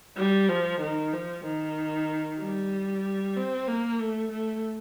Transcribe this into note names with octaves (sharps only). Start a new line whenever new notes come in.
G3
F3
D#3
F3
D#3
G3
C4
A#3
A3
A3